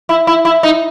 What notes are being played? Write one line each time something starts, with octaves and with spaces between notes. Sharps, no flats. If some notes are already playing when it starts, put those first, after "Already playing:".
E4
E4
E4
D#4